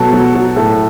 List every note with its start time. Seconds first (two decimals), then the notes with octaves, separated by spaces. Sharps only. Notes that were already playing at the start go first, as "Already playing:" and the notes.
Already playing: B2 F#3 A4
0.13 F#3
0.35 F#3
0.56 A2 A4